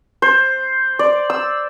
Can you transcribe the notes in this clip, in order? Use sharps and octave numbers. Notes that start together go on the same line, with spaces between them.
C5
D5
E6